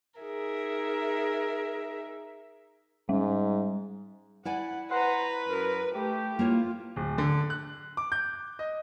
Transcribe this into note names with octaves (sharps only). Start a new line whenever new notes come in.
D#4 G#4 A#4 E5
G#2 G3
E4 D5 F#5 G#5
B4 C5 F#5 A#5
F#2 A#4
A3 G4
A#3 E4 F4 C#5
D1
D3
F#6
D6
G6
D#5